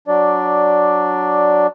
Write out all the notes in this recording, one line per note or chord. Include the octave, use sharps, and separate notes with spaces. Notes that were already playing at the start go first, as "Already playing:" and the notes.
F#3 D4 D5